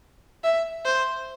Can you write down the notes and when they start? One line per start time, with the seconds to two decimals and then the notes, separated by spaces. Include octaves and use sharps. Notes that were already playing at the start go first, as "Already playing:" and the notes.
0.44 E5
0.85 C5